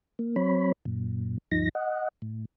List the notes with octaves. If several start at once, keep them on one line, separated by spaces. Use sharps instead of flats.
A#3
F#3 C4 C#5 B5
F#2 A#2
D2 G2 F3 D#4 A#6
D#5 F#5
A2